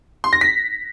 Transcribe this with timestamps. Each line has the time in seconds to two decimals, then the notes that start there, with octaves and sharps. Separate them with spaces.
0.24 C6
0.33 A#6
0.41 B6